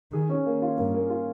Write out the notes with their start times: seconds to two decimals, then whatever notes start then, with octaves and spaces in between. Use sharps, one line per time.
0.13 D#3 G#4
0.29 C#4
0.46 A#3
0.62 F4
0.78 G2 A#3
0.94 A#3
1.10 F4